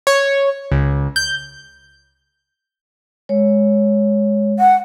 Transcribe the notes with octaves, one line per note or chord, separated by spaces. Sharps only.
C#5
C#2
G6
G#3 C#5
F#5